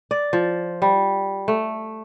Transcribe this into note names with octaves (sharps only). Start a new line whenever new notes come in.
D5
F3
G3
A3